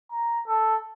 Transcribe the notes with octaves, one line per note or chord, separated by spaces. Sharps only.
A#5
A4